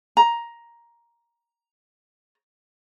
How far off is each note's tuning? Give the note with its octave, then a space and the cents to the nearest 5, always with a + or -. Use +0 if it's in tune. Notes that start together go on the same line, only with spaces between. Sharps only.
A#5 +10